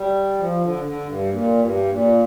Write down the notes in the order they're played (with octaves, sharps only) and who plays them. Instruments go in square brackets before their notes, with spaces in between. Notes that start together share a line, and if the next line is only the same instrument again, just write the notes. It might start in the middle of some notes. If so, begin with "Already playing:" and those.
Already playing: [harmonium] G3
F3
D3
D3
G2
A#2
G2
A#2